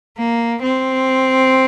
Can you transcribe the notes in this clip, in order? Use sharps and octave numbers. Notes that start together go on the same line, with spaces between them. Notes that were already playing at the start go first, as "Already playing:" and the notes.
A#3
C4